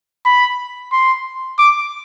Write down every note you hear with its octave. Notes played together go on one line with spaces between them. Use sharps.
B5
C6
D6